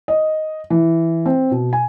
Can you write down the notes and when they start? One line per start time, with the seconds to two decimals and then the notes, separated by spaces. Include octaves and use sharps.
0.08 D#5
0.70 E3
1.26 C4
1.51 B2
1.73 G#5